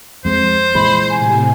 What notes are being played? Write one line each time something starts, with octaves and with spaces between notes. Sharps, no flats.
F2 G#3 C4 C5
A#2 E3 G#3 B5
A2 C3 G#5